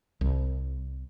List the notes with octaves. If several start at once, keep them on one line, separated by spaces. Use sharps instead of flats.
C2